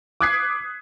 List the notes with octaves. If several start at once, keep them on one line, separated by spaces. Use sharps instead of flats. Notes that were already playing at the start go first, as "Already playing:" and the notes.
D6 D#6 F#6 G#6 B6 C7